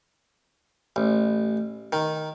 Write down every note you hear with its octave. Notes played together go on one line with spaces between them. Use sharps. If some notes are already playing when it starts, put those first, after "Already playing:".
A1
D#3